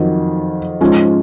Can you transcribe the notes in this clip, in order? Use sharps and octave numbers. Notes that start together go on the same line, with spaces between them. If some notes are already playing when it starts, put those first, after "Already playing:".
Already playing: F2 D#3 F#3
G#2 F3 G#3 C#4 F4